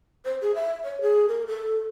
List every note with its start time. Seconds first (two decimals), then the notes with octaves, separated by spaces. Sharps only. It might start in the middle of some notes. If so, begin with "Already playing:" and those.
0.25 C5
0.41 G#4
0.55 E5
0.84 C#5
1.01 G#4
1.28 A#4
1.47 A4